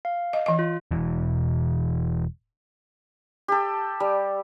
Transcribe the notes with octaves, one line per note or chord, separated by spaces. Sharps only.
F5
D#5
E3 D#5
F4
E1 E3
G4 A4
G3